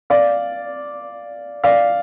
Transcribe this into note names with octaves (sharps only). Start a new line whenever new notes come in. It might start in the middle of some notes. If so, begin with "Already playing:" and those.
D5 F5
D5 F5